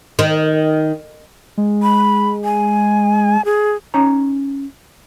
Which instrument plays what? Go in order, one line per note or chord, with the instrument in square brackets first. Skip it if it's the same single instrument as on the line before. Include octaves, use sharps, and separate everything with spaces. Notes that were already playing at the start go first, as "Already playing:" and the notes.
[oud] D#3
[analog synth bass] G#3
[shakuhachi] B5
G#5
G#4
[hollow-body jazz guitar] C#4 D#4 A#5